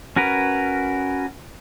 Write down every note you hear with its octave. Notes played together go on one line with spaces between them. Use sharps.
C#4 F#4 A#4 B4